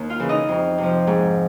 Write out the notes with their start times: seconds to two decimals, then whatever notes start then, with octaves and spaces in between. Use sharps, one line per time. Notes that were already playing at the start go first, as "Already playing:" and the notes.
Already playing: D#2
0.10 F4 F5
0.20 C#3 E3
0.29 D#4 D#5
0.49 F2
0.78 C3 F3
1.07 G#2